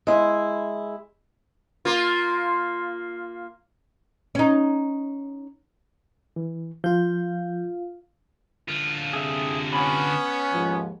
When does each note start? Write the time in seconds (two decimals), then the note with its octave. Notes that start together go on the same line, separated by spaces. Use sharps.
0.07 G#3 E4
1.85 A#3 F4
4.35 C#4 D#4
6.36 E3
6.84 F3 F4 F5 G6
8.68 D3 F4
9.13 C3 G#4 E5
9.73 B3 C#4 B5
10.53 D#2 G#2 F3